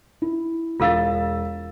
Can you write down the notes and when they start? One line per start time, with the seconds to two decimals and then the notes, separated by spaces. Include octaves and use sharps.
0.22 E4
0.80 E1 F4 A4 F5 E6 A6